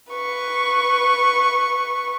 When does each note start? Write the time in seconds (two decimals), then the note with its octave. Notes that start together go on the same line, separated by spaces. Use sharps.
0.12 B4 C#6